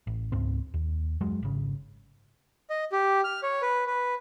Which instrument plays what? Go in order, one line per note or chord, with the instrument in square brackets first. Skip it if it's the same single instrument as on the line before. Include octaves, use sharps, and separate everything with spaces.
[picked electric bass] A1
C#2 G#2 C4
D#2
F#2 F#3 G#3
G#1 C#3
[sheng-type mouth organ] D#5
G4
F6
C#5
B4
B4